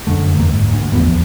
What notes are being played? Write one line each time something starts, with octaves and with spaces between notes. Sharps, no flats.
F#2 D3 A3
D1 G1 E2 A#3
G#2
D2
A1 E2 F3 B3